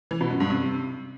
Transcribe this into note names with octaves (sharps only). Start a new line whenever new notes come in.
E3
B2
F#2
G2
C3